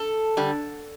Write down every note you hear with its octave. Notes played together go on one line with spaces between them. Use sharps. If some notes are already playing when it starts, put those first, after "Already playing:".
Already playing: A4
D3 G3